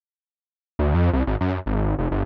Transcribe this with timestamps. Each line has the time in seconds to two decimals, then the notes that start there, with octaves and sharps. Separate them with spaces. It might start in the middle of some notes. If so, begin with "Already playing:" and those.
0.79 D2
0.94 F2
1.13 C2
1.27 G#1
1.41 F#2
1.66 G#1
1.99 F1
2.11 G1